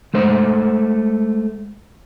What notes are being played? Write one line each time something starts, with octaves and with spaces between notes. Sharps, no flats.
G#3 A3 C5 F#5